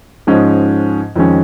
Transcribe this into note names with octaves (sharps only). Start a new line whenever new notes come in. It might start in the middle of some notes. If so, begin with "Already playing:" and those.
G#2 F3 G#3 C#4
F2 D#3 G#3 C#4